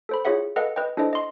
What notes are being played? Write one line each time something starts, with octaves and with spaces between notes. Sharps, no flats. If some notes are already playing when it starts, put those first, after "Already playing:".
A4 C5 B5
E4 F4 G#4 C#5 E5 F#5
A4 B4 D#5 F5 F#5
B4 D#5 G5
D4 E4 A4 C5 D#5
D#5 C6